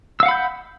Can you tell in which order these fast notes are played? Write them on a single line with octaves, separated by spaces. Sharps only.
E6 F5 F#5 B5 G6